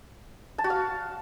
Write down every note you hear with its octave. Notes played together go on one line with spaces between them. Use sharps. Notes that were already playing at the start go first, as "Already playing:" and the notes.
A5
F#4
F5